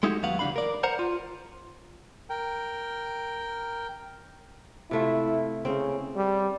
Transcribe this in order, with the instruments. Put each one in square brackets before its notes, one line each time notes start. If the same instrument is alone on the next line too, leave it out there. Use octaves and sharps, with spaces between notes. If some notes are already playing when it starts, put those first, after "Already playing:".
[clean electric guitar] G#3 A3 D#4 E4 F#4 G4
D#2 F#3 B3 F5 F#5
C#3 E3 G3 D4 F5 B5
A#4 D5
A#4 C5 F#5 A#5
F4
[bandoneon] A#4 G5
[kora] C3 A3 F4 [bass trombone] E4
[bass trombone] C#3 [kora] C4 C#4
[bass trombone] G3